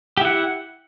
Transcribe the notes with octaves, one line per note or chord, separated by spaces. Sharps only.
E4 G4 F#5